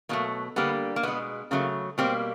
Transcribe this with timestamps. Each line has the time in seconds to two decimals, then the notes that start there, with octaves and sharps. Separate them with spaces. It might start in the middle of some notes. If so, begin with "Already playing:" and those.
0.09 B2 F#3 A3 A#3
0.56 D3 G3 A#3 B3
0.96 A#3
1.03 B2 G#3 B3
1.51 C#3 F#3 A3 A#3
1.98 B2 G3 A#3 C4